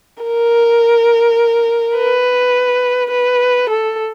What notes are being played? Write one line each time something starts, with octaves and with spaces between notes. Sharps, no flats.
A#4
B4
B4
A4